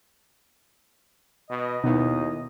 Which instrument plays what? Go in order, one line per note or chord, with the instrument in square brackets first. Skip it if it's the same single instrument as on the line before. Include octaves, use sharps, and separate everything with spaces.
[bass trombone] B2 [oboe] D#5
[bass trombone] D#2 [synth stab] B2 [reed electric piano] D#4 E4